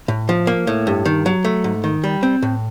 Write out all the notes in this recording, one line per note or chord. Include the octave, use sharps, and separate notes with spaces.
A2
F3
A#3
A2
G2
D#3
F#3
A3
G#2
D#3
G3
C4
A2